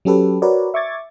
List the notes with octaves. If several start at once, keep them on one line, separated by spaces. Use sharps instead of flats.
F#3 C#4 G4 A4 B4
F#4 A#4 B4 C#5 D5
E5 C#6 D6 G#6 A6